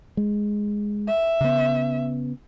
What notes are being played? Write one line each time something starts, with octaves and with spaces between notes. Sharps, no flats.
G#3
E5
C#3 B3